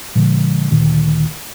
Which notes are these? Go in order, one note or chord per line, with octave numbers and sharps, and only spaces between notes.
A#2 D3 F3 G#3
D2 A#2 D#3